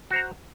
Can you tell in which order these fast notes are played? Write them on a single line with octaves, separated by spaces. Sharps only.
F#4 C5 A#5